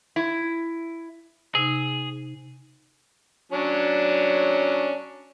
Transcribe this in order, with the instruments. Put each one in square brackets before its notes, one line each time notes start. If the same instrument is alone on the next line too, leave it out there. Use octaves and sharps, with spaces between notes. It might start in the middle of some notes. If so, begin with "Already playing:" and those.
[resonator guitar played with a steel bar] E4
[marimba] C3 D#4 [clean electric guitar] G#4
[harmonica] F#3 C#4 D4